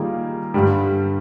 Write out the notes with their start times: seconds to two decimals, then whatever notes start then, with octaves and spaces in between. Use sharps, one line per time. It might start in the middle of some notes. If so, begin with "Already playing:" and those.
Already playing: D#3 G3 A#3 F4 G#4
0.54 G2 D3 G3